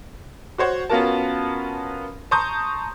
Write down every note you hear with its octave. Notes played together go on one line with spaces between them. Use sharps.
F#4 C5 C#5 F#5
B3 C#4 F4 F#4 A#4 A5
A5 A#5 C6 C#6 D#6 G6